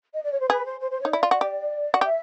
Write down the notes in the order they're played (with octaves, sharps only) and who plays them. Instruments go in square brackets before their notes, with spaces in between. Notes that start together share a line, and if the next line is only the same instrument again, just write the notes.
[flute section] D#5
D5
C#5
C5
[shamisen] G#4 [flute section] B4
[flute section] C5
C5
C5
[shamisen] D#4 [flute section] C#5
[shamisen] E4 [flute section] D5
[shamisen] F4
F#4
G4
F#4
[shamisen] G4 [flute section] E5